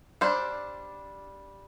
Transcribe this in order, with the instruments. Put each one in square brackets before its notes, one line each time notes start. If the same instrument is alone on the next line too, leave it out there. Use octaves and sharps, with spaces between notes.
[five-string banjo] G3 D4 C5